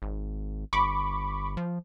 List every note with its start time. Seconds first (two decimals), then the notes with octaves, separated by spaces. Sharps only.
0.02 G#1
0.73 G1 B5 C#6 D6
1.57 F3